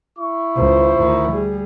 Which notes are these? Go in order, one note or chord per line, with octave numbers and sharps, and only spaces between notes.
E4 C#6
C#2 D#3 F4 C5
D2 D#3
G3 G#4